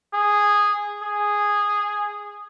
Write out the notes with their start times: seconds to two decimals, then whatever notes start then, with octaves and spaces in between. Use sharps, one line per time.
0.14 G#4
1.03 G#4